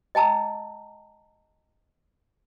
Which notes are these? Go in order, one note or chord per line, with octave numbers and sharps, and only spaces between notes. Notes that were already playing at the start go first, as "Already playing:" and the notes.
D#5 G5 A5 A#5 E6